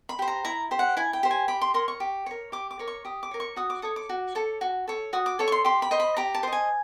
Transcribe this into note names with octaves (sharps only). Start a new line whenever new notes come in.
B5
G4 C5
A#5
E4 A#5
G4 C5
F#5
E4 G#5
G5
G4 C5
G#5
G4 B5
C6
A#4 C#5 C6
C#6
G4
A#4 C#5
G4 D6
D6
A#4 C#5
C#6
G4 D#6
D6
A#4 C#5
C#6
F#4 D#6
D6
A4 C#5 D#6
D6
F#4
A4 C#5
F#4
A4 C#5
F#4 D#6
D6
A4 C#5
C#6
C6
G4 C6
B5
C5 D#5
B5
G4 A#5
A5
C5 D#5
G#5